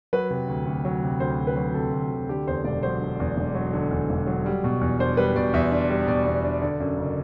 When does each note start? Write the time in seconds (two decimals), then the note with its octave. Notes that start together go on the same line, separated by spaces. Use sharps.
0.13 F#3 B4
0.30 C3
0.48 D2
0.66 D2
0.85 F#3
1.02 C3
1.20 D2 C5
1.38 D2
1.47 B4
1.56 F#3
1.74 C3 A4
1.92 D2
2.10 D2
2.29 D3 G4
2.47 E2 C5
2.64 E1 D5
2.83 F#3 C5
3.01 D3
3.20 E2
3.37 E1
3.55 F#3
3.73 D3
3.91 E2
4.10 E1
4.27 F#3
4.46 G3
4.64 B2
4.81 E2
4.99 D4 C5
5.17 G3 B4
5.36 B2 D5
5.53 E2 E5
5.71 D4
5.89 G3
6.07 B2 D5
6.26 E2
6.44 D4
6.62 D3
6.80 F#2
6.98 F#1